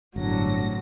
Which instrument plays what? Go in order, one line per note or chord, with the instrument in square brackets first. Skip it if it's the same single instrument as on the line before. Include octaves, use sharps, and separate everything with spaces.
[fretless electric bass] G1 [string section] A2 C3 A#6 [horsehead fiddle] F#3 [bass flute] D4